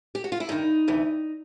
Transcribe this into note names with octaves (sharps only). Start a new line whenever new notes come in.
G4
F#4
F4
E4
G2 D#3 D#4
D2 C3 E3